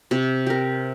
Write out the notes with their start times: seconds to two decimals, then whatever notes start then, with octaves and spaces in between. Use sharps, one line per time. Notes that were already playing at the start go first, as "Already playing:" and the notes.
0.11 C3
0.47 G4 A#4